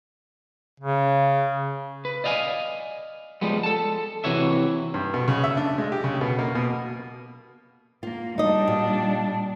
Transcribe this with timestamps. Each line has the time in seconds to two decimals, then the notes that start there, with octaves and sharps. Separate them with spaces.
0.80 C#3
2.05 B4
2.24 D5 D#5 F5 G5 G#5
3.41 F3 G3 G#3 B3
3.63 A4 A5
4.24 C3 E3 F#4 C#5 E5
4.94 G2
5.14 B2
5.28 C#3
5.44 E5
5.57 D4
5.78 G#3
5.92 G4
6.04 C#3
6.21 B2
6.39 A#3
6.55 B2
8.03 A#3 F4
8.38 G3 D4 D#4 D#5
8.68 A#2